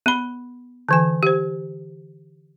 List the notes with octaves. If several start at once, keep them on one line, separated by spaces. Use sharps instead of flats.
B3 B5
D3 E3 G#5
G4 C5